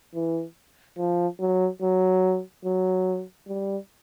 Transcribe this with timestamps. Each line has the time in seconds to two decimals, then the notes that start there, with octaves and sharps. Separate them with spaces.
0.15 E3
0.98 F3
1.40 F#3
1.82 F#3
2.65 F#3
3.48 G3